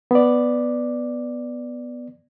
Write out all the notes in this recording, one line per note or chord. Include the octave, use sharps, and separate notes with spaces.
B3 D5